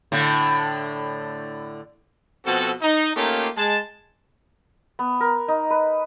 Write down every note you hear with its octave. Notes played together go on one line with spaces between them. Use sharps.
A2 D3
B2 F3 C4 F#4 A4
D#4
A3 A#3 C#4 D#4 F4 G4
G#3 A5
B3
A#4
D#4
B4